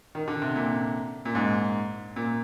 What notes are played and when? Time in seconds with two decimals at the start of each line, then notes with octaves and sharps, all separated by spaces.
0.15 D#3
0.28 D3
0.42 C3
0.56 A#2
1.25 A#2
1.35 G#2
2.16 A#2